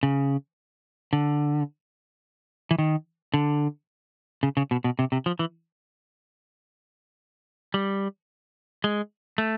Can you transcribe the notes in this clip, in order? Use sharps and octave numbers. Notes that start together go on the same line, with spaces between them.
C#3
D3
E3
D#3
D3
C#3
C#3
B2
B2
C3
C3
F3
E3
G3
G#3
A3